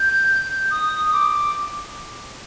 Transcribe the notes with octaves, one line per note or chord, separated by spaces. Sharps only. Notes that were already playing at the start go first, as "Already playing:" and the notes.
Already playing: G6
D#6
D6